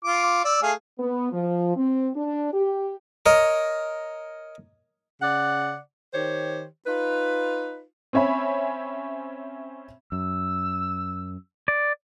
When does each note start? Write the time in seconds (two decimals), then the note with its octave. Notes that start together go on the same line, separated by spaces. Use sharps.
0.04 F4 D6
0.44 D5 E6
0.62 A3 G#4 F5
0.99 B3
1.32 F3
1.77 C4
2.16 D4
2.54 G4
3.26 A#4 C#5 D#5
5.21 C#3 D5 F#5
6.14 D#3 G4 C5 C#5
6.86 D#4 F4 B4
8.13 C4 C#4 C#5 E5 B5
10.12 F#2 E6
11.68 D5